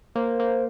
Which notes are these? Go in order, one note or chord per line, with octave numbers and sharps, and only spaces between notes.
A#3 C5
A#3